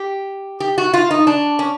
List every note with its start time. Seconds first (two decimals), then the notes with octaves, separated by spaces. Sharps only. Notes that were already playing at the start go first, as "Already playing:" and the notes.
Already playing: G4
0.60 G4
0.78 F#4
0.93 F4
1.11 D#4
1.27 D4
1.59 C#4